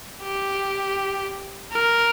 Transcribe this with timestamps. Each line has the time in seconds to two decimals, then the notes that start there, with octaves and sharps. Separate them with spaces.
0.23 G4
1.73 A#4